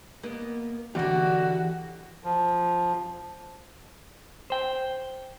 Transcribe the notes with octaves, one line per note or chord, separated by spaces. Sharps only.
A#3 B3 D#5
D3 E3 F#4 G4 D5
F3
C5 G5